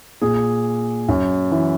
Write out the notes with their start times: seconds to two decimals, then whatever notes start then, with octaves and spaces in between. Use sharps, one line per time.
0.21 A#2 G#4
1.08 F#2
1.52 E3